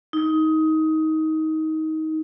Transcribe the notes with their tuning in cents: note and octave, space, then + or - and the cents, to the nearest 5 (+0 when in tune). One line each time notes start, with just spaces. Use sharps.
D#4 +20